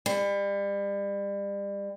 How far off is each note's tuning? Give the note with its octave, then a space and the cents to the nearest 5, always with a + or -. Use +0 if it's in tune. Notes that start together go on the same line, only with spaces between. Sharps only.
G3 +35